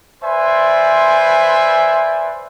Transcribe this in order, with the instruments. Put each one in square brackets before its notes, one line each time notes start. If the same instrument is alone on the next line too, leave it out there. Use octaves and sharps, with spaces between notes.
[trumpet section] B4 C5 D5 E5 G#5 C6